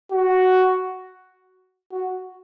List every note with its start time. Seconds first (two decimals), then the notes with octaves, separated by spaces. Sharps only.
0.12 F#4
1.92 F#4